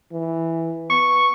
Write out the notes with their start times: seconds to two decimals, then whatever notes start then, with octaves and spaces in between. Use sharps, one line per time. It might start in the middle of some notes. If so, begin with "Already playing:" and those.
0.12 E3
0.90 B3 C#6